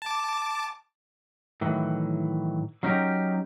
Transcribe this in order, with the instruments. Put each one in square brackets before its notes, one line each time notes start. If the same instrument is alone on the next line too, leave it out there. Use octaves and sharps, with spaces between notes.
[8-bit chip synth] A5 D6
[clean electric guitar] A2 D#3 E3 F#3
F#3 C#4 D#4 F#4 G4 A#4